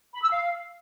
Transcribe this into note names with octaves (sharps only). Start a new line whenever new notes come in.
B5
E6
F5